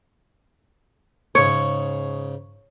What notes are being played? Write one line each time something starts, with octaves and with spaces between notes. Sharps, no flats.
G#2 C#3 C#5